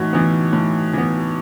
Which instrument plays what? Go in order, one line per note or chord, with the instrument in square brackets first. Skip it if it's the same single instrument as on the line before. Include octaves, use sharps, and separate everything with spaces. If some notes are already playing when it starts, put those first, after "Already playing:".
Already playing: [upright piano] A2 E3 [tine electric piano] D#4 F#4
[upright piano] E3 B3
A2
E3 B3